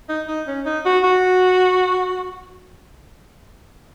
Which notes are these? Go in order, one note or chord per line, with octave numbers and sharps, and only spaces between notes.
D#4
D#4
C#4
D#4
F#4
F#4